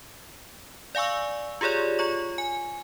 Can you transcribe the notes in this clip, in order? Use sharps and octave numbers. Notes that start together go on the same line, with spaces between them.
D5 F5 G#5 C#6 E6
F4 G4 G#4 C#5 D5
F4 C#5 C#6
G#5